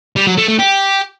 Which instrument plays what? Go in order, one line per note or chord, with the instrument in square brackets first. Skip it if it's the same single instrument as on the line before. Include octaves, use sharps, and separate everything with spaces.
[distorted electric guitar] G3
F#3
A3
A3
G4